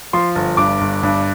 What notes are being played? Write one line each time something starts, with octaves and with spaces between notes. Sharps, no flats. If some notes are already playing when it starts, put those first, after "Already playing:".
F3 C6
G1
G2 D6
G1
G2